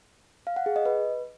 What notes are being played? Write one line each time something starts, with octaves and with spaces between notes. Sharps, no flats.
F5
F#5
G#4
D#5
B4